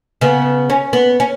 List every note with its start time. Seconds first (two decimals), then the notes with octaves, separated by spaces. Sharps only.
0.21 C#3 B3
0.70 C#4
0.93 B3
1.20 C#4